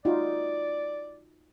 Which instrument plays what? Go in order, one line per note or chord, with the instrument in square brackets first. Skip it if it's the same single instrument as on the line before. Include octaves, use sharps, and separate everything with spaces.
[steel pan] D#4 F4 F#4 [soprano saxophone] D5